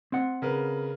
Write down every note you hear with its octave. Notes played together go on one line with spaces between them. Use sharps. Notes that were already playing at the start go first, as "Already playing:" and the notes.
C4 F#5
C#3 A#4 B4